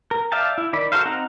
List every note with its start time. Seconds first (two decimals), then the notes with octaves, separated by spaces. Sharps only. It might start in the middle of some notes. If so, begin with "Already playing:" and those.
0.11 A#4
0.32 D5 E5 F5 G5 A5
0.58 E4
0.73 D#3 D5 B5
0.92 F#4 A4 A#4 C5 F5
1.05 C4 D#4 F#5 A#5